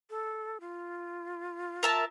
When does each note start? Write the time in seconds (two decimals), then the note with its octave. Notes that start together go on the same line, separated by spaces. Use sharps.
0.10 A4
0.60 F4
1.83 A#4 E5 A5